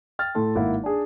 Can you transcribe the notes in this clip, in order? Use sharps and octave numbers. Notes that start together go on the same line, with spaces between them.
G5 F6 A6
A2 A3 A4 C6
G#1 A#3 E4 F#5
D4 G#4